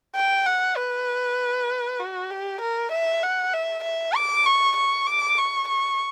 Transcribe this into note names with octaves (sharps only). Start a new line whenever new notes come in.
G5
F#5
B4
F#4
G4
A#4
E5
F#5
E5
E5
D6
C#6
C#6
D6
C#6
C#6